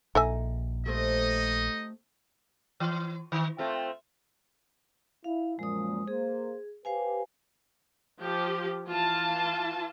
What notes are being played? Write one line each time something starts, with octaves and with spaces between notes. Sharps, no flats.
A#1 D#4 A4 E5 G#5
G3 A3 C4 D#4 D#5
E3
D#3
A3 C4 F4
E4 F5
F#2 A#2 F3 G#3 D#6
A#3 G#4 C5
G4 B4 C5 F5 G#5
F3 G4
E3 F4 A5